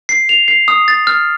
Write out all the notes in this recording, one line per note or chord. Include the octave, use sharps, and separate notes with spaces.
C7
F7
C7
D#6
A6
F6